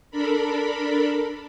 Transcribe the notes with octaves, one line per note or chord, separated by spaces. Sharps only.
D4 A4 A#4 B5